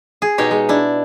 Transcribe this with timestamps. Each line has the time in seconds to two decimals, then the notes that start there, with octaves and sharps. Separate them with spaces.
0.22 G#4
0.38 B2 D#4 G4 C#5
0.51 G#3
0.69 D4 E4